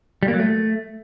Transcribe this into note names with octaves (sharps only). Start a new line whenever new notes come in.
G3
A#3
F#3
A3